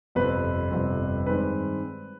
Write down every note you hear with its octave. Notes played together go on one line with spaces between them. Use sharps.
G1 F2 C3 G3 C4 B4
G1 F2 C3 G3 C4
G2 D#3 G#3 C4 B4